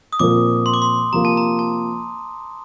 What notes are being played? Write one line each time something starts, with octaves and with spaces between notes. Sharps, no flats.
D#6
A#2 F3 C4 F4 A#4 D6
C6
D6
C6
C3 F3 A#3 F4 A#4 A#5
A5
A#5
A5